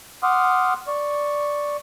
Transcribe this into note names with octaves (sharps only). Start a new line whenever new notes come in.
F#5 C6 D6 D#6 F6
D5 C#6